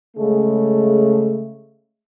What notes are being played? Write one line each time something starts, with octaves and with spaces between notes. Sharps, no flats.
C#3 G#3 A3